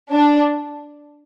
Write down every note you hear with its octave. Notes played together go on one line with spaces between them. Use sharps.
D4